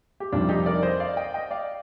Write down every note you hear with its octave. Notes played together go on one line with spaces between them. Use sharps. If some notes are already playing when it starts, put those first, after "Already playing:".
G4
F1 F2 D#3 G3 D4 F4
D#4 G4
A#4 D5
C5 D#5
D5 F5
D#5 G5
D#5 G5
D5 F5